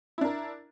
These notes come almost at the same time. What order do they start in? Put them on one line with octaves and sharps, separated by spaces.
E4 D4 A#4